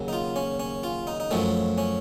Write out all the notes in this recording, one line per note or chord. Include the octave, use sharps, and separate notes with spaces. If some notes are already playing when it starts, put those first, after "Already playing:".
Already playing: D#2 C#3 F#3
D#4
F4
C#4
C#4
F4
D#4
D#4
F#2 F3 A3 C#4
C#4